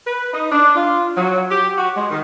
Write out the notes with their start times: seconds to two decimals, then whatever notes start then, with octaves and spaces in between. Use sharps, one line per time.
0.05 B4
0.32 D#4
0.52 D4
0.75 F4
1.16 F#3
1.50 G4
1.76 F#4
1.95 G#3
2.10 D#3